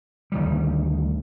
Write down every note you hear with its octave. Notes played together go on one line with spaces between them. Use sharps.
D2 D#3 G3